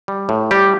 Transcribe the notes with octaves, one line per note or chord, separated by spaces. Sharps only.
G3
A2
G3 G4